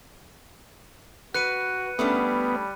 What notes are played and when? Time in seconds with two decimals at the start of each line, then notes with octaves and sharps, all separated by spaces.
1.34 F#4 B4 F#6 C#7 D#7
1.99 G3 A3 B3 C#4 D4 B5